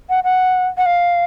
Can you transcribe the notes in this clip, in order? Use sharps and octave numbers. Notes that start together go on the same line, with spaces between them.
F#5
F#5
F#5
F5